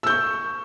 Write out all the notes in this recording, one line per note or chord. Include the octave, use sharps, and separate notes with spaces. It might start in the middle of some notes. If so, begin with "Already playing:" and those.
C#6 E6 G6